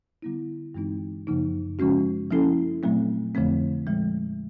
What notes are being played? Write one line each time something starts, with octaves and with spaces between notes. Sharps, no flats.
D3 G3 B3 E4
G2 E3 G#3 C4 D#4
F#2 C#3 F3 A#3 D#4
C#3 F3 G#3 C#4 F#4
F3 A#3 C#4 E4 A4
A#2 F#3 A3 C4
F2 D3 F3 A3 C4
A#2 F3 G#3